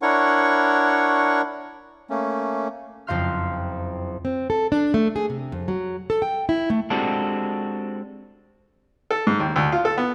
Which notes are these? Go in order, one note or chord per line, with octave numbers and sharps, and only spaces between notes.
D4 E4 A#4 C#5 F#5 C#6
A3 A#3 C#4
F#1 F2 C4 F5 C6 F6
C4
A4
D4
A3
G#4
C3
F2
F#3
A4
G5
E4
A3
G#3 C4 D4 F#4 G4 A4
A4
G#2
D#2
D2
F4
A4
B3